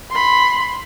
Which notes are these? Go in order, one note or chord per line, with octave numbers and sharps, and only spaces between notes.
B5 C6